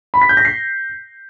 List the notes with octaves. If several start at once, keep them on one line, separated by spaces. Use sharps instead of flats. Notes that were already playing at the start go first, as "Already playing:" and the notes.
B5
B6
G6
A#6
C7